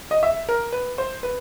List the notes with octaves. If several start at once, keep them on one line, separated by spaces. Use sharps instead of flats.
D#5
E5
A#4
B4
C5
B4